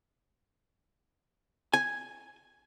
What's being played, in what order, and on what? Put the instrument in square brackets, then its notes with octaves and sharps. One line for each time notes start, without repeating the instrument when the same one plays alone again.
[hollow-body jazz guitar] G#5